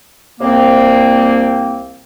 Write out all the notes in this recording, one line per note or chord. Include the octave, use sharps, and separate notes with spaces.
C2 A#3 C4